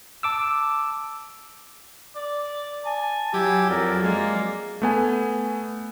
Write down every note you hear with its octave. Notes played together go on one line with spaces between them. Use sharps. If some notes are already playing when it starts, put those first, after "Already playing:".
A5 D6 E6
D5
G#5 A5
F#3 E4 G4 G#5
F2 A#4 D5
G#3 A#3
A3 B3 G#5